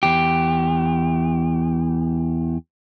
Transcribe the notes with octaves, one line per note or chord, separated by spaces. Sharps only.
E2 G4